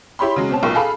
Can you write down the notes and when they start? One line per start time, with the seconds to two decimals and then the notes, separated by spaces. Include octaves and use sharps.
0.19 E4 G4 C#5 B5 C6
0.36 C#3 F#3 G#3
0.50 B2 C4 C#4 A5
0.63 B1 A#2 A#3 G5 C#6
0.75 G#4 A4 F5 B5